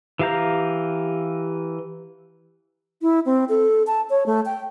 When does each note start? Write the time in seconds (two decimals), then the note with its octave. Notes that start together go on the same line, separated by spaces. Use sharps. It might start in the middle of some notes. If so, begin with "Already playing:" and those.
0.19 E3 G4 F5 A#5 G6
3.02 E4
3.26 C4
3.49 A4
3.87 A5
4.10 C#5
4.26 A3
4.46 G5